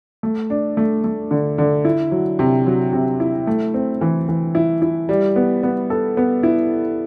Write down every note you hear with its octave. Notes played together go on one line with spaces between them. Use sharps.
A3
D4
A3
A3
D3
D3
E4
F#3
C3
F#3
C3
E4
A3
C4
E3
E3
E4
E4
G3
B3
B3
A4
B3
E4